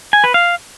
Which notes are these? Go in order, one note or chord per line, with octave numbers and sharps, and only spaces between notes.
G#5
B4
F5